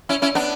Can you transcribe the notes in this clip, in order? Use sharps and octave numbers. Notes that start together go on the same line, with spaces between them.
C#4 E4
C#4 E4
B3 D4